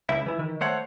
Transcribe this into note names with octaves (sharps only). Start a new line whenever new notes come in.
C#2 E4 E5
E3 E4
D#3
A3 C5 C#5 F#5